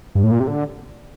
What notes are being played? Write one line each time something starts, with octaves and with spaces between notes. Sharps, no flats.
G2
A2
A#2
C3
D3